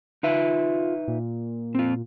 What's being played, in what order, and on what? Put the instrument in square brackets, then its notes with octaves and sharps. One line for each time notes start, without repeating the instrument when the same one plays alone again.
[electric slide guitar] D#4 B4 E5 [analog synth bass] F4
[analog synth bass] A#2
[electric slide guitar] C4 F4